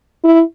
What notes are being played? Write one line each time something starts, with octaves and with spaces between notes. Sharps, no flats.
E4